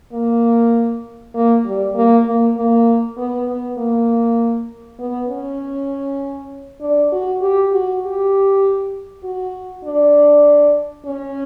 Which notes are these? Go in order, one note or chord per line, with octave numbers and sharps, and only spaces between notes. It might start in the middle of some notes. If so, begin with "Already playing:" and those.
A#3
A#3
G3
A#3
A#3
A#3
B3
B3
A#3
B3
C#4
D4
F#4
G4
F#4
G4
F#4
D4
C#4